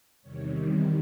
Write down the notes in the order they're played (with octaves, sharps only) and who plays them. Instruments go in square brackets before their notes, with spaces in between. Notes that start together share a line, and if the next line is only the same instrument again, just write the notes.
[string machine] E2 C3 D#3 G3 C#5